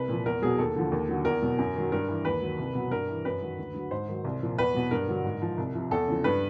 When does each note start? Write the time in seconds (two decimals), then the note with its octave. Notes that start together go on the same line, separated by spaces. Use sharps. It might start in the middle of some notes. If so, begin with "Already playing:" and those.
Already playing: C2 B4
0.09 A#2 F3
0.26 E2 A#4
0.42 B2 F#3 G#4
0.59 D#2 A4
0.76 D3 F3
0.92 D#2
1.09 D3 F#3
1.25 E2 A#4
1.42 B2 F#3
1.58 F#2
1.76 D#3 F#3
1.92 G2 A#4
2.08 E3
2.25 D#2 B4
2.41 D#3 F#3
2.58 C2
2.75 B2 F#3
2.91 G2 A#4
3.08 E3
3.25 F#2 B4
3.42 D#3 F#3
3.59 D2
3.74 D3 F#3
3.91 G#2 C5
4.08 D#3 F#3
4.24 C2
4.42 A#2 F3
4.58 E2 B4
4.74 B2 F#3
4.91 G2 A#4
5.09 D3 F#3
5.24 G#2
5.42 F3
5.57 C2
5.74 C3 F3
5.91 E2 A4
6.07 C#3 F3
6.24 G2 B4